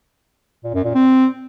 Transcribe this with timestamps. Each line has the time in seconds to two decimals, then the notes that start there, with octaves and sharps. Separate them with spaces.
0.64 A#2
0.74 F#2
0.84 A#2
0.95 C4